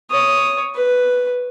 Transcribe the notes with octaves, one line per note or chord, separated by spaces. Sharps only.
C#5 D#6
B4